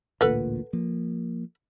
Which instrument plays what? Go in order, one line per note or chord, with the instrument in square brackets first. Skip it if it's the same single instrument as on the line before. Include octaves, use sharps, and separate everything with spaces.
[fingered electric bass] A1 D2 A#2 [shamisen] A4 B4 F#5
[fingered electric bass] F3 A#3